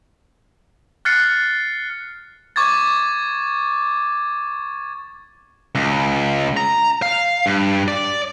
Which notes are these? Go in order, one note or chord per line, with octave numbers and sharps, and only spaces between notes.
F6 F#6 A6 C7 C#7
C#6 D6 G#6 A6
C#2
A#5
F5
G2
D5